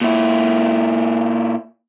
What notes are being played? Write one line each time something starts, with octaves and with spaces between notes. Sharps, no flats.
A#2 E4